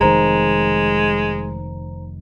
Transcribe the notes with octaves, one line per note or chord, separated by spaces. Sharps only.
F1 D#3 G#3 C5 A#5